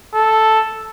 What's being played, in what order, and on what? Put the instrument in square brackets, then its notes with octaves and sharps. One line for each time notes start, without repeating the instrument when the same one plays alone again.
[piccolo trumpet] A4